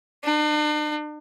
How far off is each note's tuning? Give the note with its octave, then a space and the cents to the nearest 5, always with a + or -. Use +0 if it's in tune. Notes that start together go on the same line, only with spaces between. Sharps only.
D4 +45